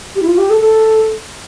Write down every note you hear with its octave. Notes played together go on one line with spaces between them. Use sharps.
G4
E4
F4
G4
A4
A4